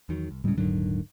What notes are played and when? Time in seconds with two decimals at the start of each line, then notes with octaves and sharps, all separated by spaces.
0.09 E2 D#3 F#3
0.31 C2
0.44 D2 A2 C#3 G3 G#3
0.58 D#1 G#2 D3 D#3 F#3